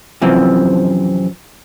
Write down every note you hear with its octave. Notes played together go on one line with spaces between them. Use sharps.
F#2 C3 E3 F3 C4